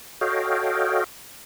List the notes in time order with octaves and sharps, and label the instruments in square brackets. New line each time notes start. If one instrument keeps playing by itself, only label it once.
[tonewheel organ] F#4 A4 C#5 D#5 F5 G5